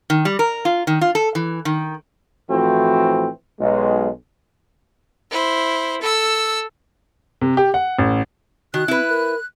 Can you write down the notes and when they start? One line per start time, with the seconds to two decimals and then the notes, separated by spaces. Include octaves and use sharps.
0.10 D#3
0.25 G3
0.39 A#4
0.65 F4
0.87 D#3
1.01 F4
1.15 A4
1.35 E3
1.65 D#3
2.50 A2 E3 F3 A3 C4 F#4
3.60 B1 G#3
5.31 E4 C5
6.01 A4 E6
7.41 C3
7.57 G4
7.74 F#5
7.99 A1
8.74 D#3 F#4 F#6
8.88 C4 E4 B4
9.09 A#4